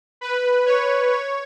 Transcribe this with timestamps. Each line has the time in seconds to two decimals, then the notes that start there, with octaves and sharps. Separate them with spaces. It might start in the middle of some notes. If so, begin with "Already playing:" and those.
0.21 B4
0.66 C#5
1.11 C#5